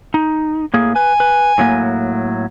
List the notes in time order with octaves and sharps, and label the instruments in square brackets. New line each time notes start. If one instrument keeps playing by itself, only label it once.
[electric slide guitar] D#4
A2 A#3 G#4
[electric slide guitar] B4 [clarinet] G#5
[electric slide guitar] B4
A2 F#3 A#3